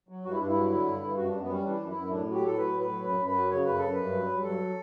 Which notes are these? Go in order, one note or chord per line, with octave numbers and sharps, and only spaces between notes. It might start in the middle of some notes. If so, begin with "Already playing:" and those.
F#3
G2 F#4
E4
G2 D4
E4
F#3
D3
G2
G2
F#2 F#4
F#2 D4
B3
G3 C#4
E3 D4
F#2
E4
F#2
A2 D4
F#3
G4
A2 A4
F#3 B4
A2
B4
F#3
F#2 B4
F#2
B4
F#3
C#3 C#5
F#2 B4
F#2 A4
G2 B4
F#3
G2
F#3 A4